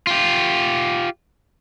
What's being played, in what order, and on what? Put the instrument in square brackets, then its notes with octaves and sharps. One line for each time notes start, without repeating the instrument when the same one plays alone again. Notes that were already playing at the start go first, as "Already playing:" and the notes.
[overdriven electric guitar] F4 G4